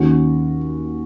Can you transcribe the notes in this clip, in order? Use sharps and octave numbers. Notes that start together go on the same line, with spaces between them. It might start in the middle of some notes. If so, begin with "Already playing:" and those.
Already playing: D#2 D#3 C#4 F#4